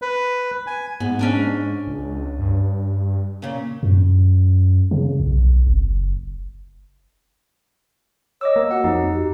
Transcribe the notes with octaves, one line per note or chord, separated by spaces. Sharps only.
B4
G#5
G#2 B3
C#4 D4 G#5
C#2
G2
A#2 C#3
F#2
C#3
B1
F#1
C#5 D#5 D6 E6
A#3
F#4 F#5
F2 D#4
G4